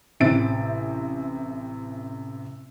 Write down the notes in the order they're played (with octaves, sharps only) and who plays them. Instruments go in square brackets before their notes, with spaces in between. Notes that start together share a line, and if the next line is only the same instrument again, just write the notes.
[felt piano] A1 C3 C4 E5 A6 D7